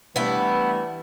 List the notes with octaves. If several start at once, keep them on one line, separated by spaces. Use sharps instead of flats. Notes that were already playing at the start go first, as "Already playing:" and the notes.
E3 G3 A3 B3 D4 E4